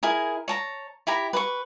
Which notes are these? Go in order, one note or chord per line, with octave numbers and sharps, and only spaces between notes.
E4 G#4 A#4
C#5 A5 A#5
E4 G4 A#5 B5
B4 B5 C#6